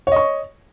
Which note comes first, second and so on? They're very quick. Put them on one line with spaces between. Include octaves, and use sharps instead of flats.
C#5 D#5 C#6